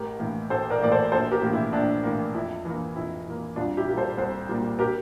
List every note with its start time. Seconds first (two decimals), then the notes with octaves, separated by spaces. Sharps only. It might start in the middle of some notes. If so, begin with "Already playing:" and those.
Already playing: A1 G4 A#4
0.19 A2 E3 A#3
0.50 A1 A4 C5
0.70 A#4 D5
0.81 A2 E3 A#3 D5
0.91 A4 C5
1.12 A#1 A4 C5
1.32 G4 A#4
1.42 A2 E3 A#3
1.53 E4
1.73 A#1 D4
2.03 A2 E3 A#3
2.34 F2 E4
2.65 E3 A#3
2.95 F2 E4
3.26 E3 A#3
3.56 C2 D4 F4
3.77 E4 G4
3.88 A#2 G3 A#3
3.97 A4 C5
4.17 C2 A4 C5
4.49 A#2 G3 A#3
4.79 G4 A#4